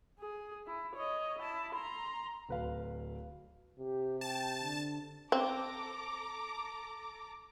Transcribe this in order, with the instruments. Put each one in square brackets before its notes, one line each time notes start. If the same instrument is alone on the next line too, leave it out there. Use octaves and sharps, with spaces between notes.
[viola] G#4
E4
C#5 D#5
E4 A5
A#5 C6
[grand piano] D1 B4 F5
[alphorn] C3 [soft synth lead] G4
[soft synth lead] G5 [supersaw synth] A5
[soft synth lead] D3
[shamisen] C4 [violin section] A4 A#5 D6